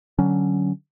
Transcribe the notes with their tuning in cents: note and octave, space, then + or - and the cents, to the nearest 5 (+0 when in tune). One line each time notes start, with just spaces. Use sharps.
D3 +10 F#3 +15 C#4 +10